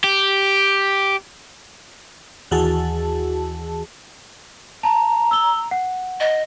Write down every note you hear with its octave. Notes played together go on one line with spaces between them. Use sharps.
G4
D#2 E3 F#4 G#4 A5
A5 A#5
E6 G7
F#5
D#5